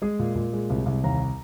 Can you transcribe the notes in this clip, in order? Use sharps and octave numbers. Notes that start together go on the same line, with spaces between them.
G#3 G#4
A#2
A#2
G#3
C2
C2
D#2 A#5